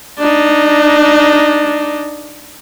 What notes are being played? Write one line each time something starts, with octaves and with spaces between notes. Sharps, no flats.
D4 D#4